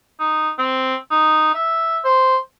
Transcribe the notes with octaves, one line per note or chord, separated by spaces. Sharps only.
D#4
C4
D#4
E5
C5